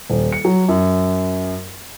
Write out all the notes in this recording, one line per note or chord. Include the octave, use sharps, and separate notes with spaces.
D#1
C#7
F#3
F#2